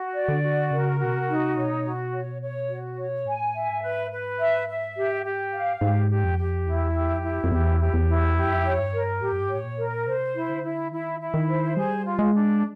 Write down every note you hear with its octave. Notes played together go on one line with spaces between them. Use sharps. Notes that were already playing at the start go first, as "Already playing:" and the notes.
Already playing: F#4
D5
D3
F#4
C#3 A#4
B2 F#4
C3
D#4
B2 C#5
F#4
C#5
C#5
F#4
C#5
A2 G#5
E5
G#2
B4
B4
E5
E5
G4
G4
F5
G#2 G4
G4
F2
G4
E2 E4
G4
F2
E4
F2
E2 G4
G4
E2
E4
F2 G4
F#2
F2
C#5
G2
A#4
A2 G4
F#2
G2
G#2 C#5
A2
A#2
A#4
C3 C5
E4
D3
E4
D#3 E4
E4
D#3
C5
G3 G#4
F4
G#3
D4